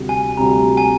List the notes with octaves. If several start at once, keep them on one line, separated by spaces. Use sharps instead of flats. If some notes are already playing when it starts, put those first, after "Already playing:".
Already playing: D2 C3 G3
G#5
D2 C3 G3 A#5
G#5